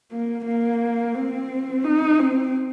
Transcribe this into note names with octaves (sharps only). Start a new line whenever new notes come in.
A#3
A#3
C4
D#4
C4